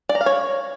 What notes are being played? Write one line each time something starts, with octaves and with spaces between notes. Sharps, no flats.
D5
A#5
F5
C#5